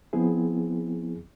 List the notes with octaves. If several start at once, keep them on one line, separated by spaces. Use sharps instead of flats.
F3 B3 C4 E4 G#4